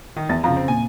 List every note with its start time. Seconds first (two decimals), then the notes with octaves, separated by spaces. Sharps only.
0.17 D#3
0.29 E2 A6
0.44 F2 C#3 F5 A#5
0.57 C4
0.68 A#2 G#5